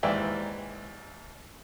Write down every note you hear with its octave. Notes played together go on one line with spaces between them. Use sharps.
D#2 G#2 E3 D5 E5 G5